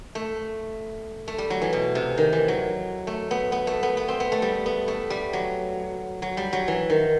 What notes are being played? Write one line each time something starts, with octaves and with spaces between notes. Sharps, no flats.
A3
A3
G3
F#3
E3
B2
C3
D#3
E3
F#3
A3
B3
B3
A3
B3
B3
C4
B3
A3
G3
B3
A3
G3
F#3
F#3
G3
F#3
E3
D#3